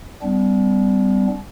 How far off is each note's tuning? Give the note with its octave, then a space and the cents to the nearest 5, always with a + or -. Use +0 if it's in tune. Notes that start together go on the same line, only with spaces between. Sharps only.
G3 +0 B3 +45 D4 -40